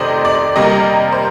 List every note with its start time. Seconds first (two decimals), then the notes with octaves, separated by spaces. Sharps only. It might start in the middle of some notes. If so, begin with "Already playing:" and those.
Already playing: F2 C3 D#3 A3 C5 D5 D#5
0.25 D5
0.56 C3 G3 A#3 D#5
1.12 C5